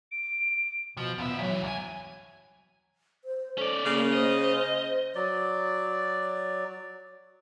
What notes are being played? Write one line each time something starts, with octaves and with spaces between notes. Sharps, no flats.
D7
B2 F3
D#2 B3 E5
A#2 E3 F#3
C2 G#5
C5
C#4 A4 D5
C#3 A#3
C5 D#5
F#3 D5